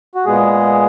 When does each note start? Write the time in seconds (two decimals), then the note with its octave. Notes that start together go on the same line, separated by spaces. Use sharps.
0.15 F#4
0.25 A#2 G#3 B3 G#4